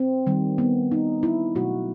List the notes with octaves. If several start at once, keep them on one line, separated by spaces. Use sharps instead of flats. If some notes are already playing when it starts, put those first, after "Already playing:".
Already playing: C4
D#3 G3
B3
D#4
E4
B2 F#3 A3 F#4